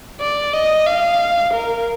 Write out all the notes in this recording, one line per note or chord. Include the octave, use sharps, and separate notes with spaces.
D5
D#5
F5
A#4